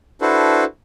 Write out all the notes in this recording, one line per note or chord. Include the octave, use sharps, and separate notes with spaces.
D4 E4 F#4 A4 B4 C5